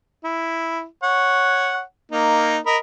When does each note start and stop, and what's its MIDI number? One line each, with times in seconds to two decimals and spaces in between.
0.24 0.85 64
1.03 1.81 73
1.03 1.81 78
2.12 2.58 58
2.12 2.58 63
2.66 2.77 70
2.66 2.77 75
2.66 2.77 83